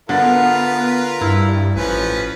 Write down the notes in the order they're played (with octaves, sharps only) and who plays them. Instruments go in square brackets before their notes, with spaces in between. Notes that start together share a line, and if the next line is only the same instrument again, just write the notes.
[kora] D3 [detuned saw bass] B3 [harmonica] F4 A#4 B4
[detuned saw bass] G2 [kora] E4
[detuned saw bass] A1 [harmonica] F3 C#4 B4